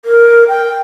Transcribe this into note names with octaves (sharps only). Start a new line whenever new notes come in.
A#4
G5